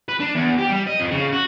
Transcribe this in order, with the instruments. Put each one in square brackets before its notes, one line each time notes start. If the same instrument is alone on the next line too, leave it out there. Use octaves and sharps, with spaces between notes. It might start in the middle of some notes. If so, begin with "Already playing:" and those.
[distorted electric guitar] B4
D4
E2
G4
G3
D#5
F2
C#3
F#4